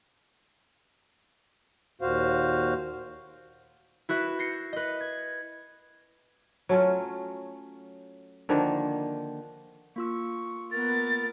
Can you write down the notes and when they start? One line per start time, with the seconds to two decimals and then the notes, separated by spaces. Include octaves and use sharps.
2.01 D#2 A#2 F#4 C5 F5
4.09 E4 F#4 B4 E5
4.39 G6 A#6 C7 C#7
4.73 B4 D#5
5.01 G#6
6.69 F#3 A3 C#4 F4
8.49 D3 D#3 F3 A#3
9.96 A#3 F4 C#6 E6
10.72 B3 A#4 A6